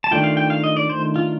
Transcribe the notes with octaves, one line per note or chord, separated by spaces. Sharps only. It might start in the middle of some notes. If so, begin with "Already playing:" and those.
A5
D#3 A3 D4 F4 G5
F5
G5
F5
D#5
D5
C5
F4